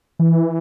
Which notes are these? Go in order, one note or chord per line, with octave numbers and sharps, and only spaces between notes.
E3